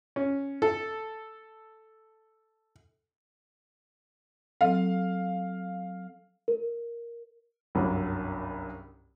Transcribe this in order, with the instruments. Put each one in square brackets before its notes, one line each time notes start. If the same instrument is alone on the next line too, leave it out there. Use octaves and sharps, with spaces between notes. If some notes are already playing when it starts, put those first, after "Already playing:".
[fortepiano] C#4
A4
[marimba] F#3 C4 A4 [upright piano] F5
[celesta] A#4
[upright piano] F#1 C2 G2 F#3